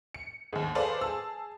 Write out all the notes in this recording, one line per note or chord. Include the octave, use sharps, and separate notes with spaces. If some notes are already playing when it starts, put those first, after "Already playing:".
C#7
D#2 G#2
G#4 A4 B4 C5 D5 F5
G#4 A5 E6